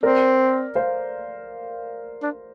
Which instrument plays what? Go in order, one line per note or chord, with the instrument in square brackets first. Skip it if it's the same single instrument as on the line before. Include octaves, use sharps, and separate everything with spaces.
[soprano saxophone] C4 [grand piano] A#4 D5
[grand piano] C5 F5
[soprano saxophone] D4